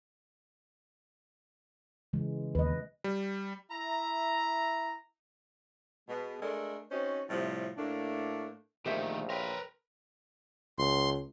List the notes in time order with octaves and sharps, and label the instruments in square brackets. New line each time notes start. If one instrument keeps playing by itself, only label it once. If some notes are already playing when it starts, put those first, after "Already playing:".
[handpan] C#3 E3 G#3
[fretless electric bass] D#2 [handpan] B4 D#5
[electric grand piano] G3
[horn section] E4 E5 A#5
[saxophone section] B2 G#3
G#3 A3 D4 A4 A#4
C4 C#4 D#4 F#4 C5
A2 C3 F3 G3
A2 A3 A#3 D4
[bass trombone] A#1 [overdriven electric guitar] D#3 A3 [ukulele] G4 C5 E5 [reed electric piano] A#4 D#5
[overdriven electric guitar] A#4 B4 [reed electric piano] C#5 G5 C6
[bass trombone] C#2 [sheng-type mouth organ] C6